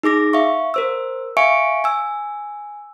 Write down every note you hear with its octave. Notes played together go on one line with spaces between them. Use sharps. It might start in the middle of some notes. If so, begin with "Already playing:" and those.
D#4 G#4 D6 A#6
E5 F5 C#6
A#4 C5 E6
E5 F5 G#5 C#6 C#7 D7
G#5 E6